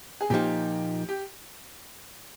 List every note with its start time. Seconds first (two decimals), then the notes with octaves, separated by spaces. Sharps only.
0.21 G#4
0.30 A#2 F3 A#3 D#4 G4
1.09 G4